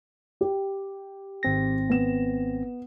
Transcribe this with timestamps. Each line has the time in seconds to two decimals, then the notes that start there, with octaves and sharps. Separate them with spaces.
0.41 G4
1.43 G#1 C4 A#6
1.90 B3 E7